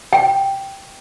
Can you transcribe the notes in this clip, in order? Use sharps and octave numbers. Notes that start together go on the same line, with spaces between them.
G5